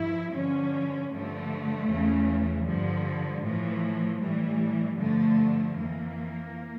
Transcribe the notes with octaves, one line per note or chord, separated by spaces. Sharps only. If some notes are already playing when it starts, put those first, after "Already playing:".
Already playing: G2 F3 E4
G2 D3 F3 C#4
G2 D3 F3 A3
E2 C#3 E3
G2 D3 F3 G3
A2 E3 F3
A2 E3 G3
G2 D3 F3 A3
F2 E3 A#3